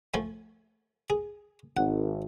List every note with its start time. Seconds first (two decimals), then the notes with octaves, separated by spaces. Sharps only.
0.14 F3 A3 G#5
1.10 G#4
1.77 G#1 F#5